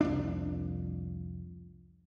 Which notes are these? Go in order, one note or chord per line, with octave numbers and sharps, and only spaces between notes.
C2 F2 D4